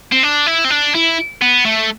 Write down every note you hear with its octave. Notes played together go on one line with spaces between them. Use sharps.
C4
D4
E4
C4
D4
E4
B3
A3